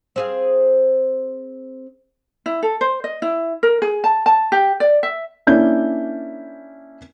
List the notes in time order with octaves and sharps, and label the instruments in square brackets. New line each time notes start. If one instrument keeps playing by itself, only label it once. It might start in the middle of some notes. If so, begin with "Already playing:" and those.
[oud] C4 G#4 F5
[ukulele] E4
A4
C5
D#5
E4
A#4
G#4
A5
A5
G4
D5
E5
[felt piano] A#3 C#4 D4 E4 G6